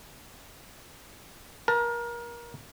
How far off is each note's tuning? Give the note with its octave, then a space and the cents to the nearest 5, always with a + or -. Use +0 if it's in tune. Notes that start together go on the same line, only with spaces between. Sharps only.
A#4 +25 A5 +30